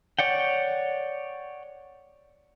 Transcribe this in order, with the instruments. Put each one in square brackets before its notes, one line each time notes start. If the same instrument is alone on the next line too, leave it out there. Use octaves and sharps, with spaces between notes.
[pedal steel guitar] C#5 D5 F#5 G5